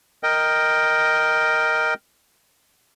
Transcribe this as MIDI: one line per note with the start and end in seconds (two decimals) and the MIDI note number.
0.23 1.94 70
0.23 1.94 75
0.23 1.94 79